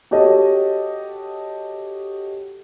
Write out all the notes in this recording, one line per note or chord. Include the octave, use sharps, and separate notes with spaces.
F#4 G4 A4 C#5 D#5